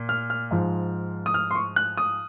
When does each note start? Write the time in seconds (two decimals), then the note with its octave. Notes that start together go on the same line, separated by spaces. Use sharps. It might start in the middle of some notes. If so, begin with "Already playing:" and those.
Already playing: A#2
0.09 F6
0.30 F6
0.51 G#2 F3
1.26 D#6
1.34 F6
1.51 C6
1.55 C#6
1.76 F#6
1.97 D#6